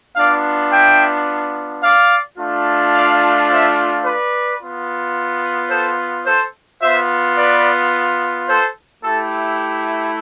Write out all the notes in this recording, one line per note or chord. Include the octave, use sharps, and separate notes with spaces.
B3 D4 F4 D5 F5
E5 G5
D5 F5
A3 D4 F4
D5 F5
C5 E5
B4 D5
B3 F4
A4 C5
A4 C5
B3 F4 C5 E5
B4 D5
A4 C5
A3 E4 G4 A4